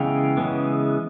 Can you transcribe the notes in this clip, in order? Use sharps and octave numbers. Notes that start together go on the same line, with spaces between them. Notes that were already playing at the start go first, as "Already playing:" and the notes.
Already playing: C#3 E3 G#3 B3 F5 G5
C#3 E3 G#3 B3